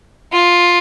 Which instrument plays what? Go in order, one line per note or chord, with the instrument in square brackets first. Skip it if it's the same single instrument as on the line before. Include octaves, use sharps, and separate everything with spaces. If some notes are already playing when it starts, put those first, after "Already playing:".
[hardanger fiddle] F4